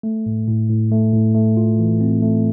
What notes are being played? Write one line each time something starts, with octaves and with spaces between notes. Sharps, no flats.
A3
A2
A2
A2
A3
A2
A3
F4
E3
C4
A3